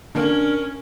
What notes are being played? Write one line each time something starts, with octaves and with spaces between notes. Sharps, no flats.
A#2 D3 A#3 C#4 D4 A#4